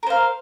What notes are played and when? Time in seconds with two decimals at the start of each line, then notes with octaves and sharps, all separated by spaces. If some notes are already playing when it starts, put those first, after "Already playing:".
0.03 A#4
0.07 C5
0.10 F5